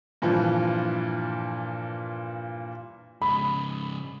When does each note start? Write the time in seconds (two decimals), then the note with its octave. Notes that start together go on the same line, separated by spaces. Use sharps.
0.22 G2 A#2 E3 F3
3.22 G#2 C#3 B5